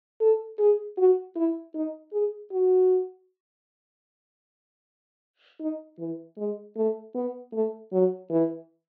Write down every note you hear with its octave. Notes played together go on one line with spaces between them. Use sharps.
A4
G#4
F#4
E4
D#4
G#4
F#4
D#4
E3
G#3
A3
B3
A3
F#3
E3